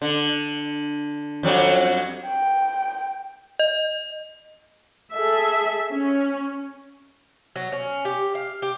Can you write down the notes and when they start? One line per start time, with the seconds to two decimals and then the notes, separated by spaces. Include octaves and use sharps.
0.02 D3
1.43 F2 F#3 G3
2.26 G5
3.59 D#5
5.13 G#4 A4 E5
5.93 C#4
7.56 F#3
7.72 C#4
8.05 G4
8.35 F5
8.62 G4